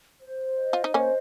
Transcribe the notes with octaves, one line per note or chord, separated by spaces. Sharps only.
C5
D#5
F4
D#4
A#3 C#4 C5